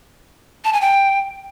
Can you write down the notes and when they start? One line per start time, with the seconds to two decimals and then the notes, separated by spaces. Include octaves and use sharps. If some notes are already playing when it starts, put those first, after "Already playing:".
0.65 A5
0.73 G#5
0.81 G5